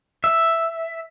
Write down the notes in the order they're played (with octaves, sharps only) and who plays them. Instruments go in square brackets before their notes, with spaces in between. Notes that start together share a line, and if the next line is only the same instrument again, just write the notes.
[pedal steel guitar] E5